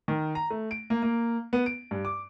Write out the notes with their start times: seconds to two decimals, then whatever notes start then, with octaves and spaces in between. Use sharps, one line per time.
0.08 D#3
0.35 A#5
0.50 A3
0.71 D7
0.90 A#3
1.03 A#3
1.53 B3
1.66 D7
1.91 G2
2.05 D6